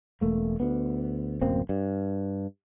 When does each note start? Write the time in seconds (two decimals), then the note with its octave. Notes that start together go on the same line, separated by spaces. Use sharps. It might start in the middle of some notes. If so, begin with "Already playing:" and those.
0.21 E1 A3 A#3
0.60 D2 B3
1.41 D1 F#2 A#3 C4
1.69 G2